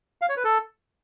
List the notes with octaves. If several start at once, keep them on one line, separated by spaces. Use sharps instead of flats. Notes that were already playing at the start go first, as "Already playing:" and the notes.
F5
C#5
B4
A4